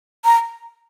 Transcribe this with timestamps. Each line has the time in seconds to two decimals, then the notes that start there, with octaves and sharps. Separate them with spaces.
0.25 A#5